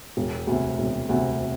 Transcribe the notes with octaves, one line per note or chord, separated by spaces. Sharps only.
E1
D2 C3
E1
D2 C3